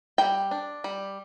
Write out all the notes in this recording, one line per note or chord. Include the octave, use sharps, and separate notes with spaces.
G3 G5
D4
G3